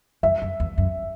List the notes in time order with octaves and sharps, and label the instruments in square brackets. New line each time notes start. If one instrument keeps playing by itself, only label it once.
[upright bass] F#2 [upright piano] E5
[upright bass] F#2
E2
F#2